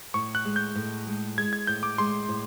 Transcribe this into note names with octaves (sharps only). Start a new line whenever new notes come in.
A2 C#6
F#6
G#3
G6
A2
G#3
G#3 G#6
G#6
A2 G6
D6
G#3 C6
A2